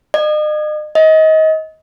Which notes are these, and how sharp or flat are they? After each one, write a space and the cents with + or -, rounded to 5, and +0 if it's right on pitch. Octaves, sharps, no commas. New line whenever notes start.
D#5 -40
D#5 +25